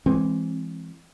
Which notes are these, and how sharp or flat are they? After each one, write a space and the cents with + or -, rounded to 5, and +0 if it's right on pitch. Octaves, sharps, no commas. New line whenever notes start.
E3 +15 G#3 -15 C4 +15